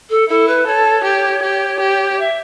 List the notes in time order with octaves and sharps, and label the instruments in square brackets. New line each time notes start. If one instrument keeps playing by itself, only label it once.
[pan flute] A4
[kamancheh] E4 [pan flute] A4
[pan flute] B4
[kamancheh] A4 [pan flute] C#5
[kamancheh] G4
G4
G4
[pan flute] E5